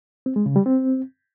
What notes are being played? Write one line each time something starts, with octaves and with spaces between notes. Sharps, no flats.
C4
G#3
C#3
G3
C4